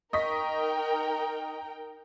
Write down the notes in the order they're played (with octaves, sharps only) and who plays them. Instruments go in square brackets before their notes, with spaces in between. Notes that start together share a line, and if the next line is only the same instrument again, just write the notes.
[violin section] D#4 A#4 G5 [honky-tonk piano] D#5 C#6 B6